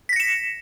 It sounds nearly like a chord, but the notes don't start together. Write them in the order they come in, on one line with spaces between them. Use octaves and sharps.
B6 A#6 C#7 E7